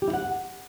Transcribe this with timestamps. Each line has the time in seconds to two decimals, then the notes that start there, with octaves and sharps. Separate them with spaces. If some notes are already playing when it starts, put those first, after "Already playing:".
0.02 G4
0.08 E4
0.13 F#5